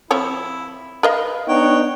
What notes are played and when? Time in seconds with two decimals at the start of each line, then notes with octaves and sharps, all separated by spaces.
0.11 F3 C4 E4 C#5
1.03 A#4 B4 D#5 F5
1.48 B3 D4 D#4 C#5 F#5 G5